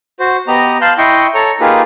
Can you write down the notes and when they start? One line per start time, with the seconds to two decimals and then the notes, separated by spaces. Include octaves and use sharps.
0.20 F#4 C5
0.48 B3 G4 D#5 A#5
0.81 F5 A5 C6 F#6 G6
0.98 E4 D#5 G5 C6 C#6
1.34 A4 C#5 A#5 C#6
1.61 A#3 D#4 F4 G4 G#4 B4